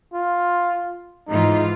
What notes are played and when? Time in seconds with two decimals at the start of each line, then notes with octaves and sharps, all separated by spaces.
0.14 F4
1.28 G#2 E3 D#4 F4